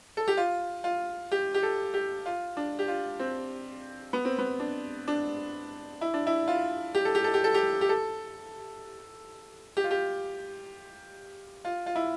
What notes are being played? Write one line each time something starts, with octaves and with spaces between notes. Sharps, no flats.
A4
G4
F4
F4
G4
G4
A4
G4
F4
D4
G4
F4
C4
B3
C4
B3
D4
D4
E4
D4
E4
F4
G4
A4
G4
A4
G4
A4
G4
G4
A4
G4
F4
G4
F4
F4
E4